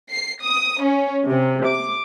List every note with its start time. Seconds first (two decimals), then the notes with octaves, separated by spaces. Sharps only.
0.11 C7
0.43 D#6
0.82 C#4
1.30 C3
1.68 D6